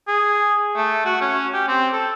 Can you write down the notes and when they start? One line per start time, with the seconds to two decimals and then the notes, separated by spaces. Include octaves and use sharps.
0.08 G#4
0.76 A3
1.05 F#4
1.21 C#4
1.53 G4
1.68 C4
1.93 A4